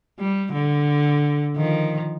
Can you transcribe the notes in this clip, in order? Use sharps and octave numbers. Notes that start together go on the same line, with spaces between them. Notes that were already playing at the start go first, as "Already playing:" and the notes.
G3
D3
D#3 F3